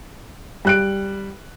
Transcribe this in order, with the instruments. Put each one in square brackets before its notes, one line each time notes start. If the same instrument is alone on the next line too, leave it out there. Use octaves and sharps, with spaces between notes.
[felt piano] G3 F#6 D7